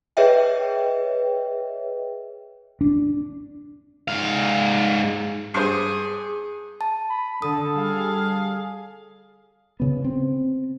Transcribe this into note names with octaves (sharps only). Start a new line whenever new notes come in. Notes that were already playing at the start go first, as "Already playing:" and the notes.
G#4 B4 C#5 D#5 E5 G5
D4
G#2 F5
G2 G#4 C5
A5
B5
D3 A4 D#6
G3 G#4 F5
C#3 B3
C4